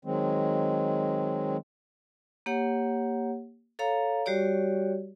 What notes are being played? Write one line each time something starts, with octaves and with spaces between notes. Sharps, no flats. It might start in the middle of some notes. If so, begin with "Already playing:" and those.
D#3 F#3 G#3 C4
A#3 G4 C#5 F#5
A4 C#5 F5 A#5
G3 F#4 G4 C#5 D5